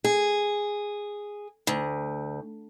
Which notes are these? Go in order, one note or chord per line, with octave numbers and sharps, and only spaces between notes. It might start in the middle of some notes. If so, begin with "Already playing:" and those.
G#4
D2